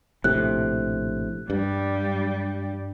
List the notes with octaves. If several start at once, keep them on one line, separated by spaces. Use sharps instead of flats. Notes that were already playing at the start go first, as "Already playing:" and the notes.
A#1 A2 C3 F#6
G2 G3